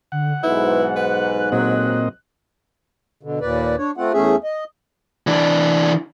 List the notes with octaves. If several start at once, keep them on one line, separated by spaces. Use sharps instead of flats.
D3 F#5
B1 G#2 E4 B4
B4 F#6
A#2 F#3 C4 D#5
B2 D3
D#2 A#2 B4 D5
D4 C#5
A3 C4 F4 F#5
E2 A3 C#4 G#4 E5
D#5
E3 D4